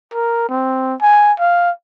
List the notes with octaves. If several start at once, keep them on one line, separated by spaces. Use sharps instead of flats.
A#4
C4
G#5
F5